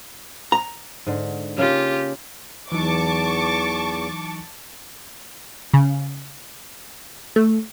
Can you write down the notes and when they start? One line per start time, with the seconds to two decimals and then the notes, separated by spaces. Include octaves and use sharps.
0.52 A#5
1.06 G#2 D3
1.57 C#3 A#3 F4 G4
2.72 E2 E3 F#3 D#4 A5 C#6 D6
5.74 C#3
7.36 A3